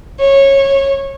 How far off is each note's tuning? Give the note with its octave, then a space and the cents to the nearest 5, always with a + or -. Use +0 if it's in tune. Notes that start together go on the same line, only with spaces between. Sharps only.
C#5 -15